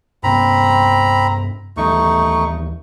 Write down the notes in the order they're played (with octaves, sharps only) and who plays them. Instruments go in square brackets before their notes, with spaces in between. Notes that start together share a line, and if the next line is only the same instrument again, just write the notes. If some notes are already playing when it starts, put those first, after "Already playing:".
[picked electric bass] G2 C3 B3 [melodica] C4 A#5 B5
[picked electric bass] D#2 E3 G3 [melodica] A3 D#4 C#6